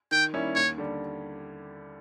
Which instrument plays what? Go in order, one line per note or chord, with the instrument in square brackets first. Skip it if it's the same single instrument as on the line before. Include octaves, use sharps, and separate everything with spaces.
[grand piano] D#3 [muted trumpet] G5
[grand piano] G3 A#3 C#4 E4
[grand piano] D#2 [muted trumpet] C#5
[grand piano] D3 G3